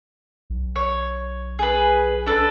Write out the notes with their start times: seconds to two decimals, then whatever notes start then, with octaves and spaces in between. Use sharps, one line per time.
0.50 B1
0.76 C#5
1.59 G#4 B4
2.26 D4 A4 B4